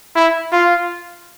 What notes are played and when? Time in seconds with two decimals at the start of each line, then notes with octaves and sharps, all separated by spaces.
0.16 E4
0.52 F4